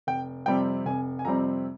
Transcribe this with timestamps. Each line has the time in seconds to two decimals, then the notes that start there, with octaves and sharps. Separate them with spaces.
0.07 F1 G5
0.46 F2 C3 G3 C4 G5
0.86 F1 G#5
1.19 G#5
1.25 F2 C3 G3 C4 A#5